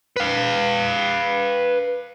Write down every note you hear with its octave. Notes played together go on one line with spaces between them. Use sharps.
B4 F5